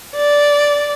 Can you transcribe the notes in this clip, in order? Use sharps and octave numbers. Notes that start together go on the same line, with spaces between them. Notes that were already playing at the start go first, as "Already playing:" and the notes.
D5